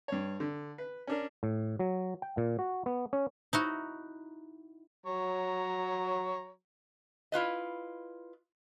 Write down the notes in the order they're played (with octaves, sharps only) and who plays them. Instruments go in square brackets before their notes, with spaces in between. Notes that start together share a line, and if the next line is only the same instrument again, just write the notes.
[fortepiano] G2 C#5
D3
B4
C#4 D4 A#4
[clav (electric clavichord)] A2
F#3
G5
A#2
F#4
B3
C#4
[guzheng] D#4 E4 F#4
[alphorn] F#3 [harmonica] C#5 A#5
[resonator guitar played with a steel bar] E4 F4 B4 D#5